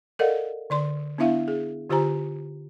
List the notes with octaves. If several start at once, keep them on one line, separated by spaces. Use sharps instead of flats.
A4 A#4 D5 D#5 F5 F#5
D3 D5 C6
B3 D4 E4 E5 F5
G#4
D3 F4 G4 C5 G#5 A#5